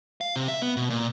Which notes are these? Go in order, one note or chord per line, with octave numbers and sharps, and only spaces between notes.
F5
C3
E5
B3
B2
A#2